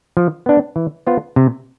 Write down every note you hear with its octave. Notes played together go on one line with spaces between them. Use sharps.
F3
B3 D4
E3
B3 F4 C5
C3